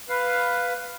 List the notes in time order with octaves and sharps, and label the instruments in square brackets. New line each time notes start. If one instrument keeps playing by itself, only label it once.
[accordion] B4 F5